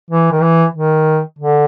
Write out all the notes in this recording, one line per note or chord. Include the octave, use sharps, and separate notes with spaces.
E3
D#3
E3
D#3
D3